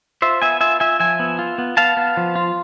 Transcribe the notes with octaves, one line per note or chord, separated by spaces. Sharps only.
F4 C5 E5
B3 E5 G#5
F4 E5 G#5
F4 E5 G#5
F3 E5 G#5
B3
F4
B3
B3 F5 A5
B3
F3
F4